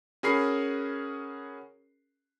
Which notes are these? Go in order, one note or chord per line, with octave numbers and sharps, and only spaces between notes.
C#4 F#4 G#4 A#4 B5 C7